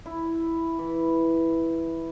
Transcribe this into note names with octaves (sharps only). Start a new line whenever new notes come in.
E4
E3